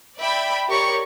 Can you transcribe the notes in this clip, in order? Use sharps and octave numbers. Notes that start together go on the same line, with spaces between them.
D5 E5 G5 B5
G4 A#4 C#5 D5 C#6